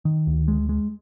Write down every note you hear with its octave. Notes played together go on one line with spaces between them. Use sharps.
D#3
D2
G#3
G#3